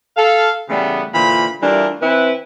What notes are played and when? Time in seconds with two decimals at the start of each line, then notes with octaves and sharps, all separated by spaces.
0.17 A4 F5
0.69 C#3 E3 G3 A3 B3
1.13 A#2 D3 E3 F4 C5 B5
1.62 E3 G3 A3 D4 F4 A#4
2.02 E3 C4 E4 B4